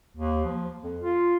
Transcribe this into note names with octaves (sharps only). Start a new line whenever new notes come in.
D#2
F3
F2
F4